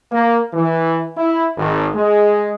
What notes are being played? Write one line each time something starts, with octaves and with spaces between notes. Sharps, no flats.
A#3
E3
E4
G#1
G#3